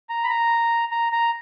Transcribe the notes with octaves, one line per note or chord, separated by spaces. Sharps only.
A#5
B5
A#5
A#5
A#5